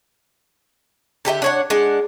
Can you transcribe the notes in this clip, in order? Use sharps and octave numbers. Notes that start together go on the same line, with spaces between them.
D3 G4 A4 E5
D4 C#5 F#5
G#3 D4 F#5